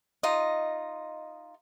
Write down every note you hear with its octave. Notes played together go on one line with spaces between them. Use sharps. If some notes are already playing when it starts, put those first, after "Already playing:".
D#4 F4 D#5